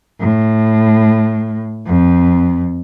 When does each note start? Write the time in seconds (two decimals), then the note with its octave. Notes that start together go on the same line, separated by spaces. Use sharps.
0.20 A2
1.86 F2